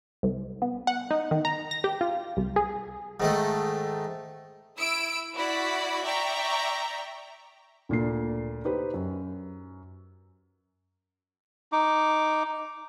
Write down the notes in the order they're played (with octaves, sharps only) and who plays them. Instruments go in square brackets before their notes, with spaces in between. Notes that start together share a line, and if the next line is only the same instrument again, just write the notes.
[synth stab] C2
B3
F#5
D#4
D#3
A#5
A#6
G4
F4
C2
G#4
[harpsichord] G#2 D#3 A3
[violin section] E4 E6 D7
E4 F#4 D5 B5
D5 E5 G5 A#5 C#6
[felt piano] D2 A#2 D4 C7
D#4 G4 B4 C5
F#2
[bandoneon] D#4 D6